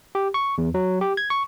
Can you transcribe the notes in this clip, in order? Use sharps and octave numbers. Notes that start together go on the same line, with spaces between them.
G4
C#6
E2
F#3
G4
G#6
C#6